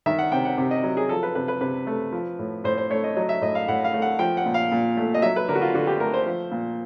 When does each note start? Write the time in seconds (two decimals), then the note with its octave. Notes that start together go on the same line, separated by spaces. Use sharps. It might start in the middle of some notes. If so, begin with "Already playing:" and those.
0.06 D#3 E5
0.19 F#5
0.32 C3 G5
0.45 F#5
0.58 C3
0.71 D#5
0.84 F#3
0.97 G#4
1.09 F3 A4
1.23 B4
1.35 C3 B4
1.48 B4
1.61 C3 B4
1.87 A3
2.13 F3
2.39 A2
2.64 A2 C5
2.78 C5
2.90 A3 C#5
3.04 D#5
3.16 F#3 D#5
3.29 E5
3.42 A2 D#5
3.55 F5
3.68 A2 F#5
3.84 F5
3.94 A3
4.02 F#5
4.19 F3 G5
4.37 F#5
4.46 A#2
4.54 F5
4.72 A#2
4.97 A3
5.14 D#5
5.22 F#3 E5
5.36 B4
5.48 D3 A#4
5.55 F#4
5.62 F4
5.74 D3 F#4
5.87 G4
6.00 A3 A#4
6.14 C5
6.26 F3
6.51 A#2